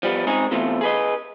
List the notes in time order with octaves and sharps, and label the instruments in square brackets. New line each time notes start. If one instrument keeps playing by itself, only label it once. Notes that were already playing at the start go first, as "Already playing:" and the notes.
[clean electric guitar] F3 G3 B3
G#3 C4 C#4 D#4 G#4
B2 E3 A3 C4 F4
G#4 B4 D#5